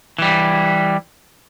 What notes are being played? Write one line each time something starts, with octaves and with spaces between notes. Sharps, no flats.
E3 G3